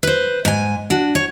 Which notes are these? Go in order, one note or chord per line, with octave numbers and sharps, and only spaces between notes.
B4 C5
G#2 G#5
D4 F#4
C#5